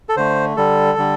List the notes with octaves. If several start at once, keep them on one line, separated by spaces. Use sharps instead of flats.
A4
D3 A3 C5
D3 G3 A4
D3 G3